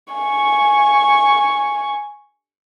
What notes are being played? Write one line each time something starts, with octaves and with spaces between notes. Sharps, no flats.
G#5 C#6